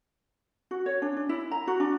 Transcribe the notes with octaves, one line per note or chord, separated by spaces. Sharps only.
F#4
C#5
D4
D4
E4
A#5
F#4
D4